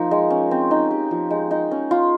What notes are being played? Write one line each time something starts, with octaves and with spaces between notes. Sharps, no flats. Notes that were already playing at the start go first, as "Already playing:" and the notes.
Already playing: F3 A#3 D#4
G#3
C#4
C4
D#4
G4
F3
G#3
D#4
C#4
F4